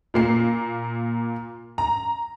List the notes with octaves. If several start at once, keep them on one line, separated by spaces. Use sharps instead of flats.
A#2 A#3 C7
A#5